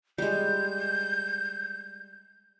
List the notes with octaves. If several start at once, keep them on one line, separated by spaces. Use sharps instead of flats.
G3 G#3 G6